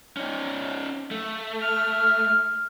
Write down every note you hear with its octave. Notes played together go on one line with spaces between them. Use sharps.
C#4 D#4
A3
F6